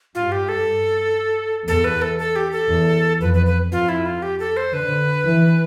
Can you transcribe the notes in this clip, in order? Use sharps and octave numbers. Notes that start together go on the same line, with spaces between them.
G2 F4
G4
A4
E2 A4
B4
A4
A4
G4
A4
E2
F2 B4
B4
B4
F2 F4
E4
F4
G4
A4
C5
D3 B4
E3